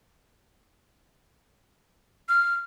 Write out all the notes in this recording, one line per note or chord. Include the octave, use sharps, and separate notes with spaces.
F6